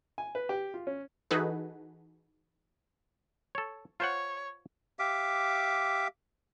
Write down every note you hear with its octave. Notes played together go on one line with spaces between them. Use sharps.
G#5
B4
G4
F4
C#4
E3 D#4 F#4 G#4 A4 B4
A4 C#5
F4 C5 C#5 F#5
G4 E5 F5 D6